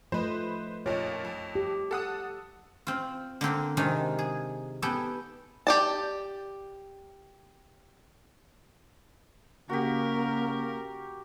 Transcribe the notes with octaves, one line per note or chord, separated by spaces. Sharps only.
F3 A3 B4 C5 D#5
F2 A#2 C#5 D#5
F2
G4
A4 F#5 D#6
C4 F4
D3 A#3 C4 D4
C3 D#3 G#3 D4 D#4 F4
G#4
B3 G4 A4 G#5
G4 D5 A5
C#3 A#3 F#4 G4 A#4